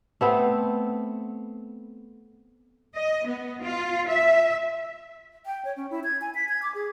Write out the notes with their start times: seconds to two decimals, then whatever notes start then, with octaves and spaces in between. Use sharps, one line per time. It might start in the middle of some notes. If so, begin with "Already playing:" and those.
0.21 A3 B3 C4
2.95 D#5
3.26 B3
3.63 F4
4.08 E5
5.46 G5
5.65 C#5
5.76 C#4
5.90 E4
6.04 G#6
6.21 G#5
6.35 B6
6.49 G#6
6.62 D6
6.75 G#4